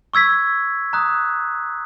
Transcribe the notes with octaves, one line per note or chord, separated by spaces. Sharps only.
C#6 E6 G#6 B6
A#5 D#6 F#6